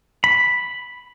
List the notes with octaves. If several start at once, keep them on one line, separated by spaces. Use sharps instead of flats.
B5